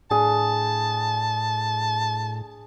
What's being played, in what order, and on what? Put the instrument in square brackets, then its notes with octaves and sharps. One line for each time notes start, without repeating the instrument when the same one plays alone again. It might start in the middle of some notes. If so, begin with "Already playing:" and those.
[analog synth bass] A2 [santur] D4 G#4 [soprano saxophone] A5